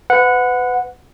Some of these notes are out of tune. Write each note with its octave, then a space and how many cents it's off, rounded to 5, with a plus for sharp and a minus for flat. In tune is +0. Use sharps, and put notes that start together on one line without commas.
B4 +30 F#5 -15